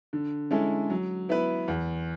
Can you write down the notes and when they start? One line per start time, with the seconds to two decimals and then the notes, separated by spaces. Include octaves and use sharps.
0.13 D3
0.51 G#3 C#4 E4 A4
0.90 F#3
1.29 B3 E4 B4
1.68 E2